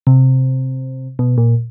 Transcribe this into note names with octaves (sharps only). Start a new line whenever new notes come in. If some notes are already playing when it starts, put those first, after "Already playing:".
C3
B2
A#2